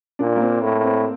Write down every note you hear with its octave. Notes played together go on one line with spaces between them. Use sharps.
A#2 D4
A#3
C4
A2
C4